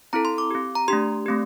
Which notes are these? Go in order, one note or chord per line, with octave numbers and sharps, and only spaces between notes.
C4 E4 A4 A#5
C6
D6
C4 G4
A#5
A3 D4 G4 C6
A3 C4 G4